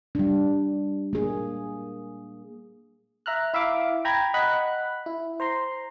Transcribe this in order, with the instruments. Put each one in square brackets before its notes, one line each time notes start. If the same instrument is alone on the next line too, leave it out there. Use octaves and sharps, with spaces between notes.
[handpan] G3 D4
A#3 G#4
[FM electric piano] E5 A#5 F6 F#6
E4 E5 F5 D6
G5 A#5 B5 G#6
D#5 F#5 B5 F#6
E4
C5 A#5 C6